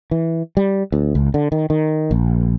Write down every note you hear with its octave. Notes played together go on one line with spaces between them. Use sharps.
E3
G3
D2
C#2
D3
D#3
D#3
A#1